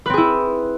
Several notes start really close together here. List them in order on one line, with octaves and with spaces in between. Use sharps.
B4 C4 G#4 E4